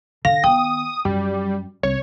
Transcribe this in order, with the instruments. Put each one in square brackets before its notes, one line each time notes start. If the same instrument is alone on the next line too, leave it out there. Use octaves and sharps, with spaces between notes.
[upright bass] D3 [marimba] F5 [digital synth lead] A#6
[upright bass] D#3 B3 [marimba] G5 [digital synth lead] D#6
[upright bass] F#2 [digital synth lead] G3
[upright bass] C2 [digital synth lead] C#5